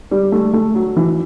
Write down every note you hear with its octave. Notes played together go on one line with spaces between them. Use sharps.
G3
A3
A3
F#3
E3